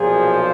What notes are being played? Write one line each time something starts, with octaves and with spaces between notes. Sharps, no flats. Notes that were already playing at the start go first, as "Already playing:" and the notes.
Already playing: B1 A#2 F3 G#4